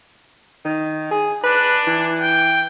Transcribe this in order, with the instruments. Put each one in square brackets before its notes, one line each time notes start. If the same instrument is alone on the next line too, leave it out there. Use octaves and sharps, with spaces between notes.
[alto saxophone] D#3
G#4
[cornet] D4 [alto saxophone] B4
[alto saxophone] E3
[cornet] G5